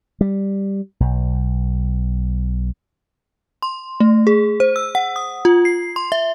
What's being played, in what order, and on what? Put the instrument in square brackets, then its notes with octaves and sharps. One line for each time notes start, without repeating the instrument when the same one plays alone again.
[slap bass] G3
B1
[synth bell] C6
A3
G#4
C5
E6
F#5
D#6
F4
C7
C6
E5